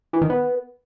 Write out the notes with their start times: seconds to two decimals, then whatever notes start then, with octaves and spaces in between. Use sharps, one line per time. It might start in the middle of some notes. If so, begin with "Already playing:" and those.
0.13 E3
0.22 D#3
0.30 B3